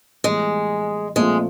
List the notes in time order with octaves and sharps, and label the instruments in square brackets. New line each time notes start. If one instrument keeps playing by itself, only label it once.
[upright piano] A2 E3 G3 B3 [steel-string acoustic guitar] G#3
[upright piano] A#2 F3 A3 C4 F4 [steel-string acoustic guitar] G#3